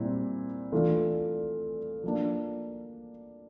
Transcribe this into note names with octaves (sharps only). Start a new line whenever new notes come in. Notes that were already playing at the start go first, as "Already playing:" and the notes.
Already playing: A#2 G3 C4 E4
E3 A3 D4 F4
F3 A#3 D4